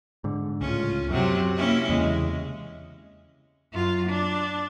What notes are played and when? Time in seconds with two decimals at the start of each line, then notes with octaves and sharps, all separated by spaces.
0.24 G#2 D3
0.61 C#2 A2 C#4 F4
1.10 F#2 C3 F#3 C4
1.56 A#3 C#4 E4
1.89 E2 C#3 G#3
3.73 F#2 F4
4.09 D4